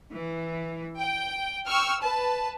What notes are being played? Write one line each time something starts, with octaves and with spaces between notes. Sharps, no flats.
E3
G5
G5 C#6 E6 F6
B4 A5